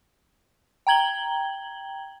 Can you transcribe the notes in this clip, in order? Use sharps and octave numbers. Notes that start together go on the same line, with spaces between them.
G5 A#5 G#6 F#7 G7